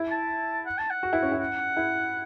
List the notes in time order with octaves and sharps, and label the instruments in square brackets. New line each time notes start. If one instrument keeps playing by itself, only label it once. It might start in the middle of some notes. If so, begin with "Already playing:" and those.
Already playing: [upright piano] E4
[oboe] A5
F#5
A5
F#5
[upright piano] F#4
E4
C#4
E4
[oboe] F#5
[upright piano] E4